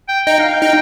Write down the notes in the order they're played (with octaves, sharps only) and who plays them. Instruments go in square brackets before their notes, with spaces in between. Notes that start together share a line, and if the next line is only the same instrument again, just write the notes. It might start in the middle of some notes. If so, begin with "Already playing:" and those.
[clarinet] G5
[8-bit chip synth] D#4 [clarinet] G5
[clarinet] F5
G5
[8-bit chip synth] D#4